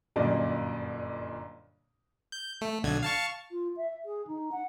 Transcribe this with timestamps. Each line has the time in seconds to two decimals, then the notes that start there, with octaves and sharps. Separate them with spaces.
0.16 G1 F#2 A#2 A#3 D5 D#5
2.32 G6
2.61 A3
2.83 B1 D3 G#6
3.03 F5 A5 C#6
3.51 F4
3.77 E5
4.05 G#4
4.27 D#4
4.52 F#5